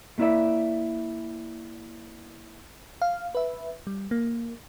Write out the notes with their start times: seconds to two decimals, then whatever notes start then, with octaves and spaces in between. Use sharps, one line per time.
0.18 A3 A#3 E4 C#5 D5 E5
3.02 F5
3.35 B4 E5
3.87 G3
4.11 A#3